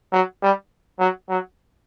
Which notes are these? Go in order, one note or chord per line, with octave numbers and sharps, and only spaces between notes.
F#3
G3
F#3
F#3